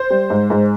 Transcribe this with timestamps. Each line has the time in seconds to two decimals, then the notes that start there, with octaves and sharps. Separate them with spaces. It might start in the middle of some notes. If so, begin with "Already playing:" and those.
Already playing: C5
0.10 G3
0.30 G#2
0.50 G#2